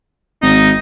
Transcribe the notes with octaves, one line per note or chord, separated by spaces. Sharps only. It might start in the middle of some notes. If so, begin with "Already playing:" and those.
G#1 D#4